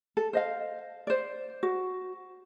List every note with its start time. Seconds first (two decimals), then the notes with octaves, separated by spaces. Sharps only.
0.17 A4
0.33 C5 D#5 F5
1.07 C5 D5
1.63 F#4